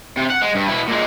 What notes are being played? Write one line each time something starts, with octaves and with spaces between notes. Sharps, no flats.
C3
F#5
G#3
G2
B2 E4
A#2 G#3